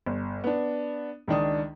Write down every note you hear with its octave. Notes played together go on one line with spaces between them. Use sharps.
G1
B3 D4
C#2 D#3 D4 D#6